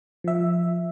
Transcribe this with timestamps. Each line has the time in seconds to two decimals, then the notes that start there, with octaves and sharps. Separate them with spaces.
0.24 F3 E5